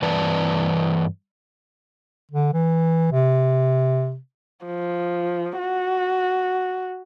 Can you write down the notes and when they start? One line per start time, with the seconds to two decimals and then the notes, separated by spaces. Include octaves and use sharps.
0.02 G2 E3 B4 D5 A5
2.32 D3
2.53 E3
3.12 C3
4.66 F3
5.59 F#4